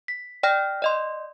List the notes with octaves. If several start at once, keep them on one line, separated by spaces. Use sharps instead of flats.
B6
D5 G5 F6 A#6
D5 D#5 C6